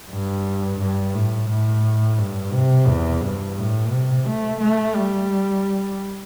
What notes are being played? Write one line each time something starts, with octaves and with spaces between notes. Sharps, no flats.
G2
G2
A2
A2
G2
C3
E2
G2
A2
C3
A3
A3
G3